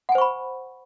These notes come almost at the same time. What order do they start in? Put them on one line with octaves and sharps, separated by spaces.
F#5 G#5 C5 C#6 B5